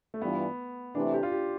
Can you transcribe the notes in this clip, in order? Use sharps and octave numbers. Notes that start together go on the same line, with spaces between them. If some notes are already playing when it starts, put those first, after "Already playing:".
A3
G2 E3 G3 B3 D4 F4
C3 E3 A3 D4
G4
F4
G4